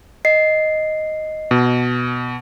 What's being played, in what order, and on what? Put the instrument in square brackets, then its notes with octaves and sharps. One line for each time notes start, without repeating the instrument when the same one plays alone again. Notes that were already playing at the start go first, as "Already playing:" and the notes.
[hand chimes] D#5 C7
[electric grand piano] B2